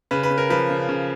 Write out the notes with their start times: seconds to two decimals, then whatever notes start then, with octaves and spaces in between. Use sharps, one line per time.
0.11 C#3 B4
0.23 B4
0.30 C#3
0.38 A#4
0.50 F3 B4
0.70 C#3
0.89 C#3